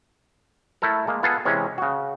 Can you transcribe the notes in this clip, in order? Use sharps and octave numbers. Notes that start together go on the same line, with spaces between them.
A3 E4 A4 A#4
G#3 A#3
B3 F4 G#4 A4
C3 E3 G#3 C#4
C#3 F#4